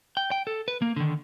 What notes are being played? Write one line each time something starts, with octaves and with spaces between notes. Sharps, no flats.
G5
G5
A4
B4
A#3
D3 D#3